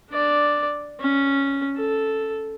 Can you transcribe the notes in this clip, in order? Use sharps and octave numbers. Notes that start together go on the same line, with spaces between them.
D4 D5
C#4
A4